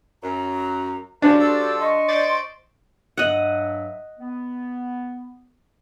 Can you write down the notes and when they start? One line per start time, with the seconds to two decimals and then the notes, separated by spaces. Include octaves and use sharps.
0.23 F#2 A#5
1.22 C#3 F3 D4 F#4 G4 C5
1.41 F3 A4 D5
1.80 D#5 C6 C#6
2.08 C5 D5
3.17 G2 F#3 D#5 E5 F#5
4.19 B3